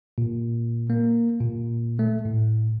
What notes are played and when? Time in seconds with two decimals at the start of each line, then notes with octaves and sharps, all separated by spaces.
0.18 A#2
0.90 A#3
1.40 A#2
1.99 A3
2.25 A2